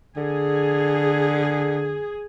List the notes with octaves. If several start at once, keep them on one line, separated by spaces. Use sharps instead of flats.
D3 G#4